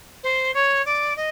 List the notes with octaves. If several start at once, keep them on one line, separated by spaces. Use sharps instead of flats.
C5
C#5
D5
D#5